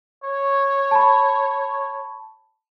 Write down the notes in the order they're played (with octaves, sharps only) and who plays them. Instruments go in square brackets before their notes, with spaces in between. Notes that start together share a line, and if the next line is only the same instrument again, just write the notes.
[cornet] C#5
[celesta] A5 B5